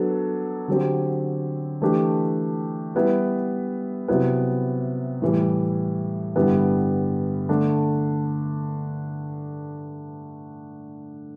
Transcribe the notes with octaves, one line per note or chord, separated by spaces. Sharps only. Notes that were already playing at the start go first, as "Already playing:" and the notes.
Already playing: F#3 B3 D4 A4
D3 F#3 C4 G4
E3 A3 D4 G4
G3 B3 E4 B4
C3 F#3 B3 E4
A2 E3 G3
G2 D3 G3 B3 E4
D3 A3 D4